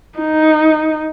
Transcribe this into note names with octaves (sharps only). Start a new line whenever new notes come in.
D#4